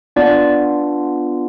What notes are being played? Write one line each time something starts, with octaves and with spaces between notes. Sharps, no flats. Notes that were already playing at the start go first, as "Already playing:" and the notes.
B3 D4 F4 D5